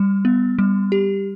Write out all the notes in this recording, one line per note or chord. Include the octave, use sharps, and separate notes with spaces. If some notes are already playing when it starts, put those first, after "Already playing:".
Already playing: G3
B3
G3
G4